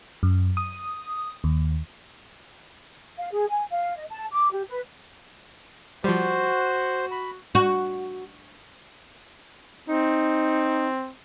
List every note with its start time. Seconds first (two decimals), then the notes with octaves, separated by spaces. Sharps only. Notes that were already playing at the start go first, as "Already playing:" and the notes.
0.23 F#2
0.57 D#6
1.44 D#2
3.19 F5
3.33 G#4
3.50 G#5
3.72 F5
3.97 D#5
4.10 A5
4.32 D6
4.52 G4
4.69 B4
6.04 F3 G3 F#4 C5
7.11 B5
7.55 F#4
9.89 C4 D#4